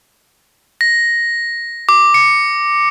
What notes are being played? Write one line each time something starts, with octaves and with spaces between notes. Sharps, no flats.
A#6
D6
C#7